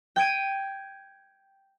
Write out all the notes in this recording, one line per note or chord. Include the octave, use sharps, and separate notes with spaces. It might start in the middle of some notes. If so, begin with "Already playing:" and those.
G5 G6 G#6 D7 D#7